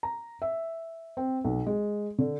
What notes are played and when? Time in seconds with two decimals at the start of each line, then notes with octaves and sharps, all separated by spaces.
0.03 A#5
0.42 E5
1.17 C4
1.45 B1
1.66 G#3
2.18 D3